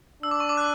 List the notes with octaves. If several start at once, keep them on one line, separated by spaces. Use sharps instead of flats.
D4 E6
D6
C#6
D6
F#6